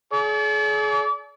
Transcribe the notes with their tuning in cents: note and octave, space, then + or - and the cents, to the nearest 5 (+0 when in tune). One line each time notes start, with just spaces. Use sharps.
G#4 +40 D5 -40